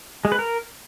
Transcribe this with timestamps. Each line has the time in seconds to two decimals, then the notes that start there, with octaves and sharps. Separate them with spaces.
0.25 G#3
0.32 B4
0.39 A#4